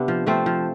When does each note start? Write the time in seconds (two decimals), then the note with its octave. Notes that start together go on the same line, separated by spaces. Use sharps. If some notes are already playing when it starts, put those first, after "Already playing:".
Already playing: C3 B3 D4
0.08 F3
0.26 F3 A3 C4
0.46 F3